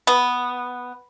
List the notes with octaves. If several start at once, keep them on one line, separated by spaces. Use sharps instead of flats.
B3